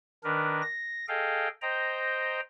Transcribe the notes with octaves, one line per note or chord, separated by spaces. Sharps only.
D#3 D4 A#4 B4
A#6
G#4 A4 D#5 F5 G5
C5 D#5 G5 A#5